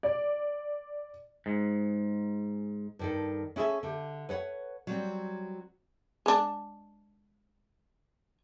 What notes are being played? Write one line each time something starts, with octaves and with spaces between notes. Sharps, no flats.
D5
G#2
G2 D#3 A4
C#4 E4 G#4 A4 E5
D3 G4
B4 C#5 F#5
F#3 G3 C4
G#3 D4